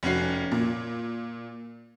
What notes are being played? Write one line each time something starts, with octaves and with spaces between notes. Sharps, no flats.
F1 C#4 F#4 C7
A#2